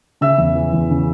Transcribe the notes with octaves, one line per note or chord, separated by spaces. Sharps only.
C#3 E5 E6
E2
E3
E2
C#3